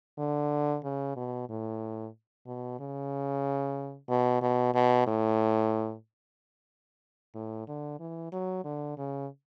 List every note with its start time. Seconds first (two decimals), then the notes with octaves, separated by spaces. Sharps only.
0.18 D3
0.84 C#3
1.16 B2
1.49 A2
2.46 B2
2.80 C#3
4.09 B2
4.42 B2
4.74 B2
5.07 A2
7.35 A2
7.68 D3
8.00 E3
8.32 F#3
8.65 D3
8.98 C#3